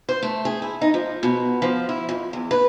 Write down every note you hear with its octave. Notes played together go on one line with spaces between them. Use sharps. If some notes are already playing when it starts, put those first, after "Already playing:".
C5
A3
G#4
E4
D#4
F3
B2
F3
E4
F2
E2
B4